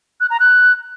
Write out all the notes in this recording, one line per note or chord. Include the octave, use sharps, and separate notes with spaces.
F#6
A#5
F#6